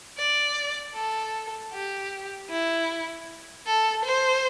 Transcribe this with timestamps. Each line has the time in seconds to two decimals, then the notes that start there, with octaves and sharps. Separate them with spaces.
0.18 D5
0.95 A4
1.73 G4
2.50 E4
3.66 A4
4.05 C5